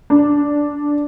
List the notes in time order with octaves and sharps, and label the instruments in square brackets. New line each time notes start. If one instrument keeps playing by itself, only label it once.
[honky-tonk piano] D4